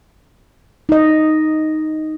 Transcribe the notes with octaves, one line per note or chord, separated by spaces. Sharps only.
D#4 D#5